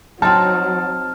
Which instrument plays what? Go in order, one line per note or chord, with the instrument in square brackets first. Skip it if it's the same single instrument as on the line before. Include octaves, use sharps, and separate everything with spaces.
[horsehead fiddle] F#3 [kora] C4 D#4 [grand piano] A5 [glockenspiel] F6